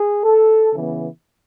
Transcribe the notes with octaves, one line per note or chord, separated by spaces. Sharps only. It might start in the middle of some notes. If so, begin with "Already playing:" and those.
Already playing: G#4
A4
C#3 E3 B3